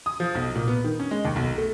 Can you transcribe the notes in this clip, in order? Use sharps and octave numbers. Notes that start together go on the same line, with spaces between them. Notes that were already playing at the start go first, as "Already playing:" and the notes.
D#6
F3
B1
A#2
B3
D#3
C#4
G#3
D#2
B1
A3